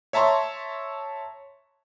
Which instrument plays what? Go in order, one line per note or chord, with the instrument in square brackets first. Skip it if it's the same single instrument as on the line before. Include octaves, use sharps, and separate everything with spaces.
[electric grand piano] C#5 E5 A5 A#5 C6 C#6